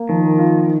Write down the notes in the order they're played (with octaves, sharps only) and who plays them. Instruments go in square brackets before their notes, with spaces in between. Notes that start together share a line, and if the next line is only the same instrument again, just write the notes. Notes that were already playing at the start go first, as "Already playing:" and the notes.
Already playing: [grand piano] A#3
[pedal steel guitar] D#3 [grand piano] F3
[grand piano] F4